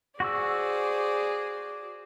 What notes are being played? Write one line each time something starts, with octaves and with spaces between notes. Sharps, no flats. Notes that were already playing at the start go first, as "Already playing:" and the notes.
F#4 G#4 C5 D5 C#6 E6